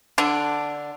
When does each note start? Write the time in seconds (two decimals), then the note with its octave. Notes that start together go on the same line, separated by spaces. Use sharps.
0.18 D3 D4